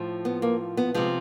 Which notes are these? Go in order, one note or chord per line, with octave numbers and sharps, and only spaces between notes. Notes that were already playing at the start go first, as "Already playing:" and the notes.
Already playing: A2 F3
B3
A#3
B3
C3 F3 G#3